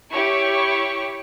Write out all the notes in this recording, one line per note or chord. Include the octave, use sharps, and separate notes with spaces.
E4 G4 C#5 C#6